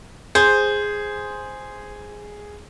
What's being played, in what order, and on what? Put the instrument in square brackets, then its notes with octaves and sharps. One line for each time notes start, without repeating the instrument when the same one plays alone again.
[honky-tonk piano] G#4 [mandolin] C5